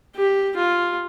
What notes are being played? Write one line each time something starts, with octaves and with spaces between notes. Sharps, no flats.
G4
F4